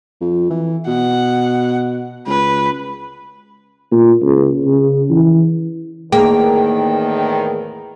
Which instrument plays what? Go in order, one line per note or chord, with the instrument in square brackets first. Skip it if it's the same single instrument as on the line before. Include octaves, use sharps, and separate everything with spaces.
[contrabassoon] F2
E3
[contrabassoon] B2 [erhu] F#5
[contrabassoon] C#2 [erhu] B4
[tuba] A#2
C#2
C#3
E3
[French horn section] E2 A2 D#3 [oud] A#3 [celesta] G#4 [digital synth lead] G5